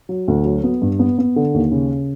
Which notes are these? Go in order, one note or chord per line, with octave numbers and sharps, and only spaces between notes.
F#3
D2
F#3
B3
G2
B3
B3
D3
D#2
C#3